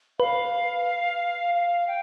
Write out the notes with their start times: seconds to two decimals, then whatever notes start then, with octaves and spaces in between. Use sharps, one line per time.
0.20 B4 F5
1.54 F5
1.87 G5